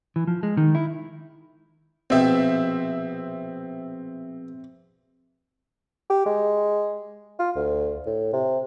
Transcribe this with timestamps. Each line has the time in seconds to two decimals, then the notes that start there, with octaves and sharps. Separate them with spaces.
0.16 E3
0.27 F3
0.43 G#3
0.57 D#3
0.75 E4
2.10 A#1 B2 C4 E5 G5
6.10 G4
6.26 G#3
7.39 F4
7.56 D2
8.06 A2
8.33 C3